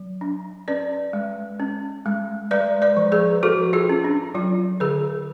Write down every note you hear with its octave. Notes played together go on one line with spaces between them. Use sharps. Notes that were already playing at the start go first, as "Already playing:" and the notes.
Already playing: F#3
D4
C#4 B4 D5
G#3
C#4
G#3
G#3 B4 D5
B4 D5
F3
G#4 B4
F3 F#4 A4
F4 G#4
C#4
D4
F#3 F4
D3 G#4 B4